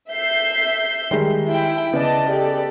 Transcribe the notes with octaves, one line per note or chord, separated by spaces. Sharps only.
E5 G6 C7
D#3 G3 G#3
E4 G5
C#3 B3 D5 D#5 A5
G4 A4 D5